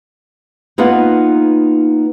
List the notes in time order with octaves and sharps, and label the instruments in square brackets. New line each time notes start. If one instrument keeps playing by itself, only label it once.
[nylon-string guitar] A#3 B3 D#4 F4 F5 F#5